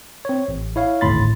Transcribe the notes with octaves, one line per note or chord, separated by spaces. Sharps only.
C4 C#5
A1
E4 C#5 F5
G#1 D2 A2 B5 C6 A6